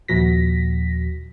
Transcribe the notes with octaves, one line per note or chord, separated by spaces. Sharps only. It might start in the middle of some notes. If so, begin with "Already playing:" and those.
D#2 A#2 F3 F#4 A#6 B6